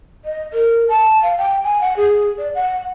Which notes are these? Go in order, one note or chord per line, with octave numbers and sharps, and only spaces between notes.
D#5
A#4
A5
F5
G5
G#5
F#5
G#4
D5
F#5